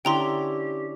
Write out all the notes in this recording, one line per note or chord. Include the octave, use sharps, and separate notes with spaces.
D3 C#4 E4 G4 G5 A#5 C6